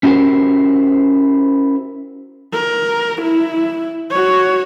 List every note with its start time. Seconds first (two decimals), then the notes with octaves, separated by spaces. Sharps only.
0.03 C#4 E4 F#4 G4 A#4 C5
2.53 A#4
3.22 E4
4.11 F#4 C#5